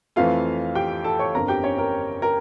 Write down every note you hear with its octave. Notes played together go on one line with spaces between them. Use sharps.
F2 E3 A3 F4 F5
G4 G5
A4 A5
C#5 C#6
G1 F2 D3 A#4 A#5
G4 G5
C#4 C#5
A#4
A#4